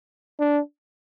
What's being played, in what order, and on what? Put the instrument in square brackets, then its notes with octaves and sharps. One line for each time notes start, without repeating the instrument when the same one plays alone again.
[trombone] D4